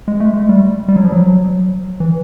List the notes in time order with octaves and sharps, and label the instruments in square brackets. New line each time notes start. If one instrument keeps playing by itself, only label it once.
[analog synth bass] G#3
A3
G#3
G3
G3
F#3
F3
F#3
E3